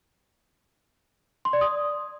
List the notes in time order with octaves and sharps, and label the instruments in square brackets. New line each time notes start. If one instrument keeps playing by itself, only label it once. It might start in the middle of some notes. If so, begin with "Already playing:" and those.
[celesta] C6
D5
D#6